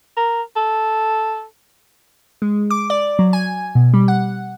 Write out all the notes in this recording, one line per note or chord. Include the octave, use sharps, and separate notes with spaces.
A#4
A4
G#3
D6
D5
F#3
G#5
B2
G3
F#5